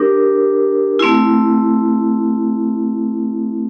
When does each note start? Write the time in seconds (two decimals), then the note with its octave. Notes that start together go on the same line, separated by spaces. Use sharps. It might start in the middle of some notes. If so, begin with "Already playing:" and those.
Already playing: D4 G4 A#4
0.99 A3 C4 E4